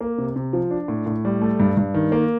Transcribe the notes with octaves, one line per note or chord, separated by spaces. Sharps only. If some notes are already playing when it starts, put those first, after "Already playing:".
A#3
C3
C3
F3
D4
A2
A2
G3
A3
G2
G2
D#3
A#3